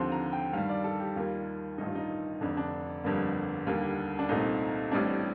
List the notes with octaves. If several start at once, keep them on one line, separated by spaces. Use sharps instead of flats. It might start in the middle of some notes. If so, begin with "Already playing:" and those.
Already playing: D#2 D3 F3 C4 C6
A#5
G5
G2 D#3 G3 F5
D5
A4
G4
D#2 D#3 G3 A#3 F4
A1 G2 D#3 D#4
F4
D#4
F1 F2 D3 D4
D4
G1 F2 D3 G3 A#3
D#2 D3 G3 A#3
D4
C2 A#2 A3 C4 D#4
A1 A2 G3 C4 D4